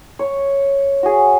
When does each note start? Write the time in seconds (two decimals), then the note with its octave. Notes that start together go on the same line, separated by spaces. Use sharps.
0.19 C#5
1.03 F#4 G#4